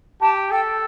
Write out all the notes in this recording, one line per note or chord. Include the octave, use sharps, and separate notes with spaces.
G4 A5
A4 G5